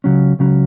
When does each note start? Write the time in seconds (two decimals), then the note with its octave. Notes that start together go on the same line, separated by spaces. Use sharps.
0.04 C#2 C#3 F#3 C#4
0.39 C#2 C#3 F#3 C#4